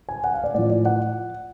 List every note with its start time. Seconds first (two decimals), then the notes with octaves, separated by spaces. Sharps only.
0.09 G#5
0.24 F#5
0.34 F5
0.44 D5
0.54 A2 F3 D5
0.70 D5
0.85 F#5